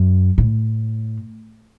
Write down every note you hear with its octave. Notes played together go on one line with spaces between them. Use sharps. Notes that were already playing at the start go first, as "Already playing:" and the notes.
Already playing: F#2
A2